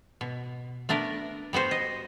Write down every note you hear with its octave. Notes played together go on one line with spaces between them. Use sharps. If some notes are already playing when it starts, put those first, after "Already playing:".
B2
A3 B3 D4 A#4 B4
G3 B3 F#4 C5
D#5